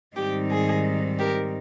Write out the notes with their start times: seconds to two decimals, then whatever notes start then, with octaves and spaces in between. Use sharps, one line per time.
0.15 G#2 D#3 G3 C4 D#4 G4
0.50 G#4
1.19 G4 A#4